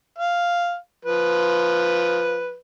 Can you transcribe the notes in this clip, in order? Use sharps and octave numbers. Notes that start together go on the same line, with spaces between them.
F5
F3 B4